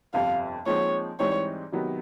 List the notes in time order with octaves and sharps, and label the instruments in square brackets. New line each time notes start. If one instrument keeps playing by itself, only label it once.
[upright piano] G1 F2 C3 [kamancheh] F5
[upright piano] A#2 F3 G#3 C4 D#4 [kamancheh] C#5
[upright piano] G#2 E3 G3 C4 D#4 [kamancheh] C#5
[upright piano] C3 D#3 F#3 B3